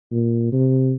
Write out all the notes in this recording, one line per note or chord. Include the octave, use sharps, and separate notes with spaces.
A#2
C3